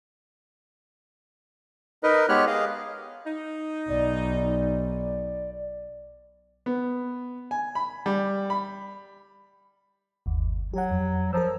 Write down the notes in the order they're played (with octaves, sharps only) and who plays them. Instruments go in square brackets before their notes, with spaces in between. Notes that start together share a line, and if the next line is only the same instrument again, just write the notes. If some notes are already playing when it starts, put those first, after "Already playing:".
[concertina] D#4 A#4 B4 D#5
G#3 B3 G4 C#5 F6 F#6
G#4 D#5 F5
[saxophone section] D#4
[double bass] B1 [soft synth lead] D5
[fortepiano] B3
G#5
B5
G3
B5
[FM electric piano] G1 D#2
[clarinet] F#3 [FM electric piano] G4 F#5
[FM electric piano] F2
[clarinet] F3 [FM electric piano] A#4 A#5 E6